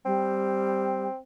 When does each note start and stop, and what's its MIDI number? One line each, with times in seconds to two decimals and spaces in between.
0.06 1.08 55
0.06 1.17 60